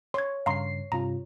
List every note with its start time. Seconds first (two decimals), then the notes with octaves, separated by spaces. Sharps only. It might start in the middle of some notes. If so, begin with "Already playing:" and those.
0.14 C#5 C6 G#6
0.46 G2 C#3 F5 A#5 C6 C7
0.92 G2 C3 F4 A#5